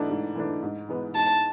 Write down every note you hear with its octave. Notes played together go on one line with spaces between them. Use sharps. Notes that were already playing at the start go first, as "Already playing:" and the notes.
Already playing: G#2 E3 A3 D4
G#2
E3 A3 D4
G#2
E3 G#3 B3
G#2 A5